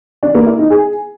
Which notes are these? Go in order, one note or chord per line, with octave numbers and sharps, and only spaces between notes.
D4
A#3
E4
D#4
G#4